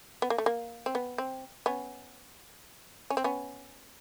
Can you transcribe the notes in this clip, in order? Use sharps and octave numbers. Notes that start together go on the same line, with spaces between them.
B3
A#3
A3
A#3
C4
B3
C4
B3 C#4
C#4
C4
B3 C#4